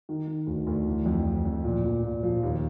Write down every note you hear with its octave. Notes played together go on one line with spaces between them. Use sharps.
D#3
D#3
D2
D2
E3
F2
F2
F2
A#2
A#2
A#2
F3
D#2